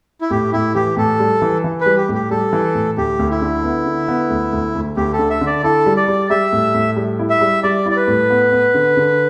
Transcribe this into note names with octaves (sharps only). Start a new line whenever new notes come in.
E4
A2 G4
A2 E4
E3 G4
A2 A4
G3
E3
E3
B4
G3
G4
A2
G4
G3 A4
E3
A2
D2 G4
D2
E4
D3
B3
D3
B3
D2
D2
D2
D2 G4
A4
D3
E5
D3
D5
E4 A4
G3
D5
G3
G3 E5
A2
A2
G3
E4
E5
G3
G3 D5
E4
D5
B4
A2
B3
B3
D3
D3